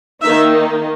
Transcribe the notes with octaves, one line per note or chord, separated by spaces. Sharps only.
D#3 A#3 D#4 E5